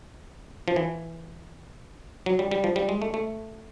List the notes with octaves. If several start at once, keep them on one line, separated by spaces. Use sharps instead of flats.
F3
E3
F#3
G3
G3
F3
G3
G#3
A3
A3